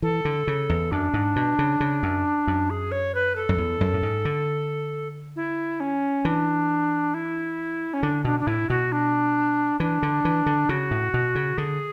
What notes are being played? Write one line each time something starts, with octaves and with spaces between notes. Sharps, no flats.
E3 A4
D3
C#3
E2
F#2 D4
G#2
B2
C#3
C#3
F#2
F#2
G#4
C#5
B4
A4
F#2
E2
F#2
A2
G#2
D3
E4
C#4
E3 D4
E4
C#4
D3 D4
B2 D4
D4
A2 E4
B2 F#4
D4
E3 D4
D3
E3
D3
C#3 F#4
A2
B2
C#3
D3 G#4